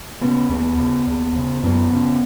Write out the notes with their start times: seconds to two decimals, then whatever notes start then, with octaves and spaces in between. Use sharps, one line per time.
0.21 C#3 B3
0.49 D#2 B3
0.78 C#3
1.07 D#2
1.35 C#3
1.63 F#2 B3
1.92 C#3